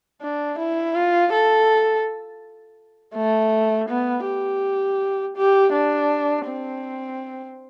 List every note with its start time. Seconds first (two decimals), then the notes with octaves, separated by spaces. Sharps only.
0.22 D4
0.59 E4
0.95 F4
1.32 A4
3.16 A3
3.89 B3
4.26 G4
5.37 G4
5.73 D4
6.47 C4